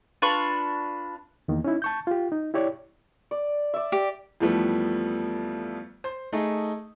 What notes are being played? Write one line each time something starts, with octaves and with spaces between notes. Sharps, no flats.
D4 F4 B4 C#6
E2 D#3 A#3
C#4 D#4 E4
A5 C#6 G6
F4 G4
D#4
E4 G4 C#5 D5
D5
D5 E5
G4
F2 E3 F3 G3 A3 B3
C5
A3 D#4 G#4